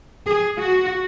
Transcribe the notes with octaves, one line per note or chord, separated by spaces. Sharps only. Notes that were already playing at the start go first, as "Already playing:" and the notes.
G#4
F#4